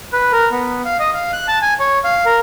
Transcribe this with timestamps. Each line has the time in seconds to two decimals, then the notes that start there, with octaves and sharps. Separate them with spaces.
0.13 B4
0.32 A#4
0.52 B3
0.85 F5
1.00 D#5
1.14 F5
1.33 F#6
1.48 A5
1.62 G#5
1.80 C#5
2.04 F5
2.26 A#4